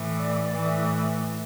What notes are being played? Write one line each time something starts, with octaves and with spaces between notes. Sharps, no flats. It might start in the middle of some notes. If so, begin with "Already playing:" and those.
Already playing: A2 E3
D5
A2 E3